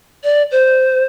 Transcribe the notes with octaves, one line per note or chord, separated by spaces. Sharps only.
D5
C5